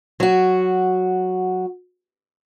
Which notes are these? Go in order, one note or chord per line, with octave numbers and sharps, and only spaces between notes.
F#3 F#4